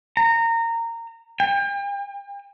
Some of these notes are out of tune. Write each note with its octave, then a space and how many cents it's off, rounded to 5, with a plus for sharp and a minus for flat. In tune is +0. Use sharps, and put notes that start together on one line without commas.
A#5 -20
G5 +40